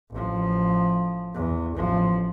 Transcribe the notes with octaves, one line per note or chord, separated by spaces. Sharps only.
A1 F3
E2
A1 F3